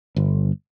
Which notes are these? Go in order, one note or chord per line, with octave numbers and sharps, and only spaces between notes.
G1